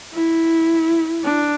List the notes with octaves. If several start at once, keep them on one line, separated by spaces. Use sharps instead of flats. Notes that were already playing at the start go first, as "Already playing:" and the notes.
E4
D4